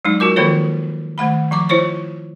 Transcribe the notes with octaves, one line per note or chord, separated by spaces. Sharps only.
F#3 G#3 D#4
F4 F#4 A#4 D6
D#3 F3 A#3 F4 A4 C#5
D#3 A3 F#5 B5
F3 A#5 D6
E4 F4 C5 C#5 C#6